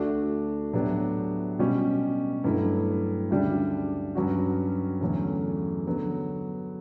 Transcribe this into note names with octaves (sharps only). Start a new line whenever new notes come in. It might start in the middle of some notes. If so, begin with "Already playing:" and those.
Already playing: D2 D3 A3 D4 F#4
A2 F#3 B3 D4 G4
B2 G3 C#4 G4
G2 F#3 A3 E4
D2 C#3 G3 D4
G2 F#3 C#4 F#4
E2 D3 F#3 A3 C#4
D3 F#3 B3